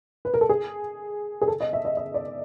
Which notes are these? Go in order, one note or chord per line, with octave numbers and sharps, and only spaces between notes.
B4
A#4
A4
G#4
G#4
A4
D#5
E5
D#5
D#5
D5